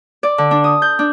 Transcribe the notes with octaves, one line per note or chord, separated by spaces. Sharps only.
D5
D3
D4
D#6
G6
D4